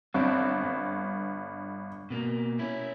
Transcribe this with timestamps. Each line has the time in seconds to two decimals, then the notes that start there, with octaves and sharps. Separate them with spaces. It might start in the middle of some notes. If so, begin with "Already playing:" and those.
0.14 G1 C4 D4
0.63 G2
2.10 B2 A#3
2.59 C#4 E4